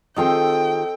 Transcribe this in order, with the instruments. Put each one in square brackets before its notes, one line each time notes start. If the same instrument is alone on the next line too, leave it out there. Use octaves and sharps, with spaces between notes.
[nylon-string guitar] D#3 F4 G#4 [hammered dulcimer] C4 A4 D#5 [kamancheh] G5